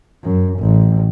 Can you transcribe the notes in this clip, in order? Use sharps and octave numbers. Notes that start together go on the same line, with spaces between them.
F#2
A1